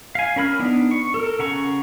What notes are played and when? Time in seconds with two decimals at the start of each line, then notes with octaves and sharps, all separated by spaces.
0.15 F5 G#5
0.36 C#4 A#4 B5 F6
0.59 B3 D4 D#4
0.91 C#6
1.14 A4 A#4
1.39 C#3 F#5 A#5 C#6